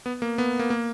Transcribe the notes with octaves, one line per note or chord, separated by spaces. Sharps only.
B3
A#3
B3
A#3
A#3